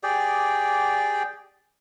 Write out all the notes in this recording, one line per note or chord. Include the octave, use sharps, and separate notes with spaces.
G4 G#4 D5 G5